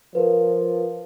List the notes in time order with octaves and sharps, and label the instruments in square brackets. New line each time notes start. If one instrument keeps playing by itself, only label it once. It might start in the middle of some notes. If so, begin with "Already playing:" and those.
[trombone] F3 [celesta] A#4 B4